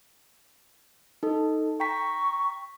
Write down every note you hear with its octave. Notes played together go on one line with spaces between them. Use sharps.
D#4 A4
G5 A#5 C#6 B6